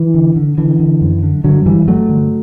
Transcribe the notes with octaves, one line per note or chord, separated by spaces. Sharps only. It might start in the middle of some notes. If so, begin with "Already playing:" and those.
Already playing: E3
D3
D3
D3 E3
D3
F#2
D3
G2 D3 F#3
G2 E3 G3
G2 F#3 A3
D3